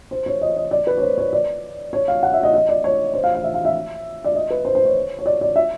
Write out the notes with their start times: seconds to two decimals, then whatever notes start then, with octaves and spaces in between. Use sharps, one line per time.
0.11 C5
0.26 C#5
0.41 D#5
0.57 D#5
0.71 D5
0.87 B4
0.97 C#5
1.02 C5
1.18 C#5
1.33 D5
1.93 C#5
2.08 F5
2.23 F#5
2.33 E5
2.43 D#5
2.54 D#5
2.69 D5
2.84 C#5
3.14 C5
3.24 F5
3.35 F5
3.44 E5
3.54 F5
3.65 E5
4.24 D5
4.35 D#5
4.50 B4
4.65 C5
4.75 C5
4.85 C#5
5.19 C#5
5.26 D5
5.41 D5
5.56 E5